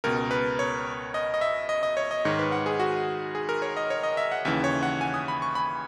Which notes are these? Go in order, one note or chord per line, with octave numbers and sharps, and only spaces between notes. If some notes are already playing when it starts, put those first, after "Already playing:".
C#2 B2 A#4
B4
C#5
D#5
D#5
E5
D#5
D#5
C#5
D#5
G#2 D#3 C#5
B4
F#5
G#4
F#4
G#4
A#4
C#5
D#5
C#5
D#5
E5
F#5
D#2 C#3 E3 E5
C#5
F#5
G#5
D#6
B5
C#6
B5